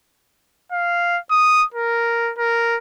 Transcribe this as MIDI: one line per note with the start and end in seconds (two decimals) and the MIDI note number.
0.72 1.19 77
1.31 1.64 87
1.74 2.32 70
2.38 2.77 70